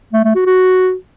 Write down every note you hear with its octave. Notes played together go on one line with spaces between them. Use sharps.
A3
A3
F#4
F#4